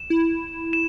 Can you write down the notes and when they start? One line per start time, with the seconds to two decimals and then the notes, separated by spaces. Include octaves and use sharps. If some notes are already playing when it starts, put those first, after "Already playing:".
Already playing: E7
0.10 E4
0.73 E7